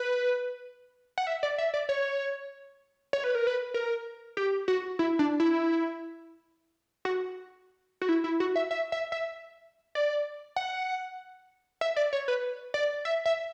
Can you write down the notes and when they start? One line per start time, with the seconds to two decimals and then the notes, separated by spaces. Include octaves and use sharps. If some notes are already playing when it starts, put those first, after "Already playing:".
Already playing: B4
1.18 F#5
1.27 E5
1.43 D5
1.58 E5
1.74 D5
1.89 C#5
3.13 C#5
3.24 B4
3.35 A#4
3.47 B4
3.74 A#4
4.37 G4
4.68 F#4
4.99 E4
5.19 D4
5.40 E4
7.05 F#4
8.02 F#4
8.09 E4
8.24 E4
8.40 F#4
8.56 E5
8.71 E5
8.92 E5
9.12 E5
9.95 D5
10.56 F#5
11.81 E5
11.96 D5
12.13 C#5
12.28 B4
12.74 D5
13.05 E5
13.25 E5